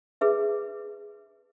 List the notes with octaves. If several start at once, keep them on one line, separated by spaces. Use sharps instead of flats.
G#4 B4 E5